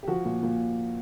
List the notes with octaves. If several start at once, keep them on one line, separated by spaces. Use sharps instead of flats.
G4
F3 F#4
A#2
A#2